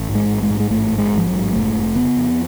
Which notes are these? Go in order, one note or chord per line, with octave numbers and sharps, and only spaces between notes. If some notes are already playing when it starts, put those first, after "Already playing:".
Already playing: A1
G#2
G#3
A1
G#3
G#2
G#3
A1 A3
G#2
G#3
A1
F3
F#3
G#2
F1 A3
F1
C#3 B3
F2